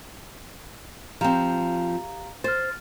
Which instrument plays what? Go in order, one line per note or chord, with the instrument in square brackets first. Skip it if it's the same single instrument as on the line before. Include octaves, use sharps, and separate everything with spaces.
[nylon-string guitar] F3 C4 [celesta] G4 F5 A#5
[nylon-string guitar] C5 [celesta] F6 A6